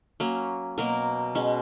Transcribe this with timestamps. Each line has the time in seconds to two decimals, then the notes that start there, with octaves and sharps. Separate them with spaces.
0.20 F#3 A#3 C#4
0.78 B2 F#3 A#3 A#4
1.35 B2 G#3 C#4